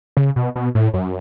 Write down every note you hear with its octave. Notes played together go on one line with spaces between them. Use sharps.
C#3
B2
B2
A2
F#2